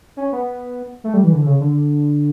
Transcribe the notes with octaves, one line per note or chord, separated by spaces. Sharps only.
C#4
B3
A3
G3
E3
D3
C#3
D3